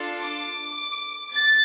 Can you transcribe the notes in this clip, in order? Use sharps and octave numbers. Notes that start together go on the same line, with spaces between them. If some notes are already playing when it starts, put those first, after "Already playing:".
Already playing: D4 F4 A4
D6
A6